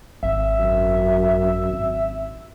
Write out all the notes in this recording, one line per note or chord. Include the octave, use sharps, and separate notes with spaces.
G#1 E5
F#2
G#1